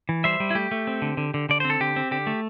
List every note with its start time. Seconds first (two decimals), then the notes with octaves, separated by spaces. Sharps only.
0.09 E3
0.24 G3 C5 E5
0.40 G3
0.50 E4
0.55 A3 G4
0.71 A3
0.87 C4
1.02 D3
1.17 D3
1.34 D3
1.49 D3 D5
1.60 C4 C5
1.70 A4
1.80 D3 G4
1.96 C4
2.11 D3 G4
2.27 A3